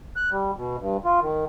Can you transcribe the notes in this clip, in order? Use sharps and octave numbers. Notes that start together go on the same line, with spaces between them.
F#6
G3
B2
G2
F4
D#3